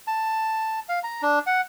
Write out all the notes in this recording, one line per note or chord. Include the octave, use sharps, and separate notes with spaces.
A5
F5
A#5
D4
F#5